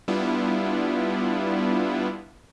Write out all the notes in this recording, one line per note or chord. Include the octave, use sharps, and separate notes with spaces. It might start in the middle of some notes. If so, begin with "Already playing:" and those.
G3 B3 D4 E4 F4